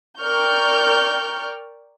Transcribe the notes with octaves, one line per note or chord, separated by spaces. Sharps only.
A#4 D5 G5 C#6 F6 G6